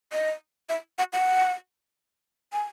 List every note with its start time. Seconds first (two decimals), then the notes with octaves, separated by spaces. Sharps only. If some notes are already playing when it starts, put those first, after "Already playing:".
0.12 D#5
0.69 E5
0.98 F#5
1.13 F#5
2.52 G#5